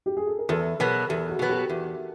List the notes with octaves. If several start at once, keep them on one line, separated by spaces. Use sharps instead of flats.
G4
G#4
A4
A#4
E2 A4 B4
B2 F#3 B3 G#4 A#4
E2 G4 A4
F#4 G#4
B2 F#3 B3
G4 A4
E2